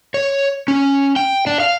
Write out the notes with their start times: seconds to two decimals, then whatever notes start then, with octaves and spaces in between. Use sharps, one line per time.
0.14 C#5
0.68 C#4
1.16 G5
1.47 D4
1.60 F5